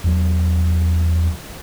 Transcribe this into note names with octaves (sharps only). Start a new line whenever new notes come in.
E2 F#3